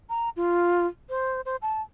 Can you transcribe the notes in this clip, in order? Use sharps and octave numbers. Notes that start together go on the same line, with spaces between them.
A#5
F4
C5
C5
A5